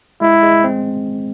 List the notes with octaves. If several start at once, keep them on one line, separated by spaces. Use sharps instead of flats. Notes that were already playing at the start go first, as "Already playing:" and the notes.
G#3 E4
G#3
C4